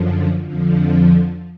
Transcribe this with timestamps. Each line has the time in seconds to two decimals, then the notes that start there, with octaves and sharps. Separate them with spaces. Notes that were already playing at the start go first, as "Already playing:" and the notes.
Already playing: F#2 D3 F3
0.43 F2 D3 F3